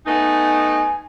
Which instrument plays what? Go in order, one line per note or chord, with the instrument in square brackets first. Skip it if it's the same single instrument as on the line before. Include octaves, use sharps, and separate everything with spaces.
[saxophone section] A3 B3 D#4 [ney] G#5